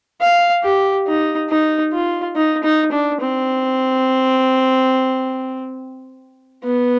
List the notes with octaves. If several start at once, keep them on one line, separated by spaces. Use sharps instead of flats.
F5
G4
D#4
D#4
F4
D#4
D#4
D4
C4
B3